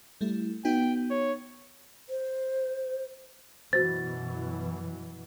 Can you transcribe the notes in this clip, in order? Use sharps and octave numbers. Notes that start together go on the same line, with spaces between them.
G3 A3 E4
B3 D#4 F#4 G5
C#5
C5
F#2 B2 E3 F#4 C5 A6